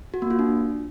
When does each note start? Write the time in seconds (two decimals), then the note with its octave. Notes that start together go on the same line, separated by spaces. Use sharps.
0.14 F#4
0.22 A#3
0.30 F4
0.39 D4